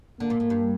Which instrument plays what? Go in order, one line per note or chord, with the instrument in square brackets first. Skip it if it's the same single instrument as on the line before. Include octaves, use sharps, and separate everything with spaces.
[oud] D3 [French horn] A#3
[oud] A#2
A2
G2